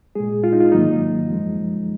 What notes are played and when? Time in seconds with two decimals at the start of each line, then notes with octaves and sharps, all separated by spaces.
0.15 A#2 G#3 G#4
0.44 F4
0.53 D#4
0.60 F4
0.72 G#2 D#3 F#3 A#3 D#4
1.29 F#2 F3 G#3